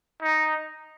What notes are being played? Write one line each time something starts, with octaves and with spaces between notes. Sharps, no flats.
D#4